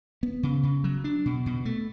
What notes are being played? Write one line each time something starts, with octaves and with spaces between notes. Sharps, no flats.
B3
C#3
C#3
F#3
D4
B2
B2
A3